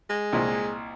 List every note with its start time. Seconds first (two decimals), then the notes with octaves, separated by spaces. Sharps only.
0.10 G#3
0.33 C2 A#2 D#5